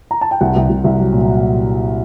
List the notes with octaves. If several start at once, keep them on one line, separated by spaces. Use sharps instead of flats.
A#5
A5
G5
C2 F#5
C2
C2
C2
F#3
A#2